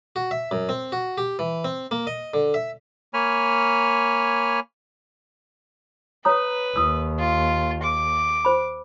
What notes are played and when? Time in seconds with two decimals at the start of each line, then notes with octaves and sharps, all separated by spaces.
0.16 F#4
0.31 E5
0.51 F#2
0.69 C4
0.92 F#4
1.18 G4
1.39 E3
1.64 C4
1.91 A#3
2.07 D#5
2.34 D3
2.54 E5
3.14 A#3 C#5 G#5 B5 F6
6.25 B4 C#5 A#5 D#6
6.76 D#2 D#6 E6
7.19 F4
7.83 D6
8.45 C5 B5